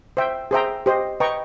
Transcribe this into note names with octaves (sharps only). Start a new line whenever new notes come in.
C5 E5 G5
G#4 C5 E5 G5 A#5
G4 C5 D#5
B4 D#5 G5 A#5 C#6